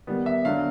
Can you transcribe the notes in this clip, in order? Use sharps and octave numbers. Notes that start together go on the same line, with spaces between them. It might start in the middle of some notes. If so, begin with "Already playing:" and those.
D#3 G3 B3
E5
D3 F#3 B3 D4 F5